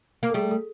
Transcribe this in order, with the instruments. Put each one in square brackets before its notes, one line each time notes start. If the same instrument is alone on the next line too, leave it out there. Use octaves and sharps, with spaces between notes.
[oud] A#3
[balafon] A4
[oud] G3 A3 [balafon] G#4
[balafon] A4